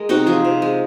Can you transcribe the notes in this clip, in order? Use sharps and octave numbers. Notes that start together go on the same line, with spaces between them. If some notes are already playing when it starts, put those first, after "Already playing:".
Already playing: G#3 A#4
C3 D#4 F#4
F3 F4 G#4
C3
G#3